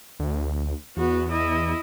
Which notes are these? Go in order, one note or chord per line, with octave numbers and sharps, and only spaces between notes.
D2
E2 B3 F#4
E4 D#5